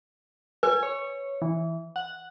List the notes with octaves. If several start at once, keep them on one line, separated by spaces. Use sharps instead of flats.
B4 G#5
C#5
E3
F#5